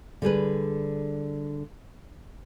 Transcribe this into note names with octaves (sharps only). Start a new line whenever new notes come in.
D3 G3 G#4 B4